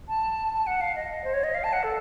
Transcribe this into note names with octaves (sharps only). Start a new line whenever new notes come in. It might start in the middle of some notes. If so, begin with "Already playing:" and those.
A5
A5
F#5
F5
D#5
C5
C#5
D#5
F5
A5
F#5
A4